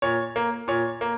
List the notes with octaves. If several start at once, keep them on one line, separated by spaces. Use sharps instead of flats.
A#2 C#5
A#3
A#2 C#5
A#3